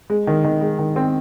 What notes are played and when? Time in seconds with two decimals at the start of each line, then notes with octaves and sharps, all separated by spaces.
0.10 G#3
0.27 D#3
0.44 D#3
0.61 G#3
0.79 D#3
0.96 C4